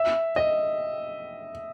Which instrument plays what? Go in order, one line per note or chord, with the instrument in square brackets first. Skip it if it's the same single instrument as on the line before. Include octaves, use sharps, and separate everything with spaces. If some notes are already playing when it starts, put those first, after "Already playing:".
Already playing: [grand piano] E5
D#5